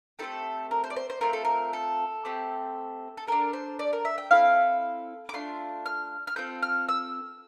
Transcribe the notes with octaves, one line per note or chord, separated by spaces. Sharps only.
A3 C4 E4 G4 A4
A#4
C5
D5
C5
C5
A3 C4 F4 A4 A#4
A4
A#4
A4
A3 C4 G4
A4
D4 A4 A#4
C5
D5
A#4
E5
G5
C4 E4 A4 F5
D6
A3 D4 F4 C6
F6
F6
C4 F4 A4 G6
F6
E6